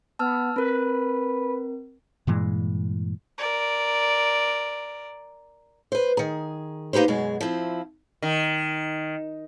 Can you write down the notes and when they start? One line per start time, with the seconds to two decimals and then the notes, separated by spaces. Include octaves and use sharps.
0.19 B3 A5 E6 F6
0.56 C4 A#4 B4
2.27 G2 A#2 E3 G#3
3.38 A#4 D5
5.92 B4 C5
6.17 D#3 G#4
6.93 A#3 D#4 G4 B4 C5
7.08 F#2 B2 G#3 G#4
7.41 F3 C4 E4
8.22 D#3